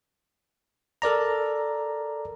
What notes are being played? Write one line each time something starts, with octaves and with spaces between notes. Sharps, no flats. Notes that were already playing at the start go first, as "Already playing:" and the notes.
A4 A#4 D5 A#5